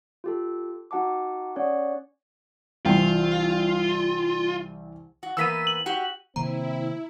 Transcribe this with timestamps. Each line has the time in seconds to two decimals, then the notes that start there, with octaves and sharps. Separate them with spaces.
0.24 F4 G4 A4
0.91 D#4 F#4 F#5 A5 D6
1.56 C#4 C#5 D5 F#5
2.85 C2 E3 F4 G5
5.23 F#4
5.37 E3 A#3 B3 E6 B6 D#7
5.67 F#7
5.86 F#4 G4
6.36 C3 D#3 A#3 C4 E4 A#5